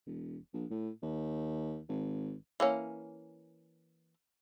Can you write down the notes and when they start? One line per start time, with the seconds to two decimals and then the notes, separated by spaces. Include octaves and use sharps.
0.06 E1
0.53 A#1
0.70 A2
1.02 D#2
1.89 G#1
2.60 E3 A#3 C#4